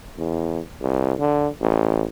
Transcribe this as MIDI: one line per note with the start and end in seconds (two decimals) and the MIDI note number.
0.18 0.60 40
0.81 1.13 36
1.19 1.48 50
1.61 2.07 33